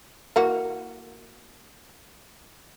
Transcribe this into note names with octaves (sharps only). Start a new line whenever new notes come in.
E3 A#3 F#4